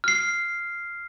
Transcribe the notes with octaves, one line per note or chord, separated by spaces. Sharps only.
F6 C7